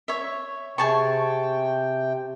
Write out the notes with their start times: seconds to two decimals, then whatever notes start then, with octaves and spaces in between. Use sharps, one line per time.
0.08 C#5 E5
0.78 C3 G#4 G5 A5 C#6